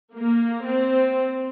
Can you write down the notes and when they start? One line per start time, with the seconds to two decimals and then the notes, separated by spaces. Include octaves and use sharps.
0.15 A#3
0.65 C4